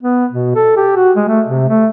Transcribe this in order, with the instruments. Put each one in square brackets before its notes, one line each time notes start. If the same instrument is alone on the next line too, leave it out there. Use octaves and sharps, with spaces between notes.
[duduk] B3
B2
A4
G4
F#4
G#3
A3
C3
A3